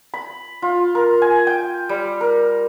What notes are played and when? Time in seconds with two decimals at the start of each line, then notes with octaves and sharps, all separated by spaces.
0.14 B5
0.62 F4
0.95 A#4
1.22 G#5
1.47 G5
1.89 G3
2.21 A#4